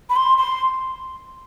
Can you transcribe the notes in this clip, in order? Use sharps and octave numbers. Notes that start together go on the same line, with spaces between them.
B5
C6
C6